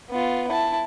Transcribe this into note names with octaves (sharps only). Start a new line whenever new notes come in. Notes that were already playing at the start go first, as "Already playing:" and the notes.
B3 F4
E4 A5